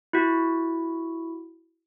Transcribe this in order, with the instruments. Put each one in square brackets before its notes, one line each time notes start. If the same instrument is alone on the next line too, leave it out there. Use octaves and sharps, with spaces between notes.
[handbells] E4 F#4